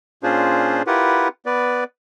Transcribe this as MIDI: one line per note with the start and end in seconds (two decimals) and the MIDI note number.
0.23 0.82 46
0.23 0.82 61
0.23 0.82 62
0.23 0.82 65
0.23 0.82 68
0.23 0.82 72
0.87 1.28 64
0.87 1.28 65
0.87 1.28 67
0.87 1.28 70
0.87 1.28 71
0.87 1.28 78
1.46 1.84 59
1.46 1.84 71
1.46 1.84 74